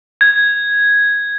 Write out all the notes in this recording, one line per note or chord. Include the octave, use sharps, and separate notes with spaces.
G#6